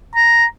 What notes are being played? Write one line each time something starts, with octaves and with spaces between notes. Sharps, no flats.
A#5